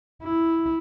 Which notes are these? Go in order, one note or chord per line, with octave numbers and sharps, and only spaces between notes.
E4